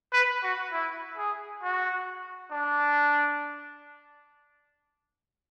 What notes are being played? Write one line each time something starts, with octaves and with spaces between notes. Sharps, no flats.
B4
F#4
E4
G#4
F#4
D4